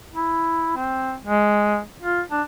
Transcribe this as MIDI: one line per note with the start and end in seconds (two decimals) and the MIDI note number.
0.14 0.75 64
0.76 1.16 60
1.25 1.80 56
2.02 2.22 65
2.32 2.42 62